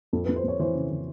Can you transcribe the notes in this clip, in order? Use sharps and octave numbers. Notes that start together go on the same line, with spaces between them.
F2 A4
B4
F2
C5
F2 C#5
E3 C5
C#3
E3